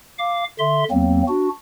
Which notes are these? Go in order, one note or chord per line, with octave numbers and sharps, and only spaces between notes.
F5 D6
D3 E5 C6
E2 F#3 A#3 C4
D4 F#4